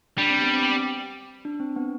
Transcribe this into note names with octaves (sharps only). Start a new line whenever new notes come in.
G3 D4
C4
B3
C4
D4
C4
B3